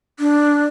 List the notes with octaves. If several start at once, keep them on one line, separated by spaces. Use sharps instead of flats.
D4